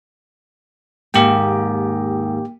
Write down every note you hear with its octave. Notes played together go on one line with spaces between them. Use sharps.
D#2 G#2 A#3 G4 G5